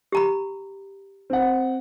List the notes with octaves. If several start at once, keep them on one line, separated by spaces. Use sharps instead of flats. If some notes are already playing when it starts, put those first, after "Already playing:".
G4 A#5 B5
C4 F#5